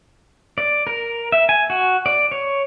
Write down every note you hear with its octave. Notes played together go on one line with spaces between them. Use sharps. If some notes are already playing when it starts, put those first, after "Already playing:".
D5
A#4
E5
G#5
F#4
D5
C#5